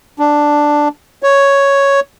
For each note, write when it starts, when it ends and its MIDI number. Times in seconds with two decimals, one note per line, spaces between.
0.19 0.88 62
1.23 2.00 73